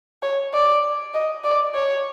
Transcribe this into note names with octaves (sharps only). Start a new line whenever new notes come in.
C#5
D5
D#5
D5
C#5